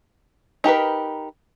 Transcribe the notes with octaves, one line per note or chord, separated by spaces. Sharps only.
D#4 G4 A#4 B4